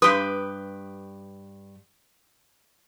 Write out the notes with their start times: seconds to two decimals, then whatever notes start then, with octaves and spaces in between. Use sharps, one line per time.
0.02 G2 G4 B4 D#6